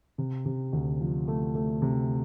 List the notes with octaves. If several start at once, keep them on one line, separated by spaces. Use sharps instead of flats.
C3
C3
D2
F3
A3
A3
C3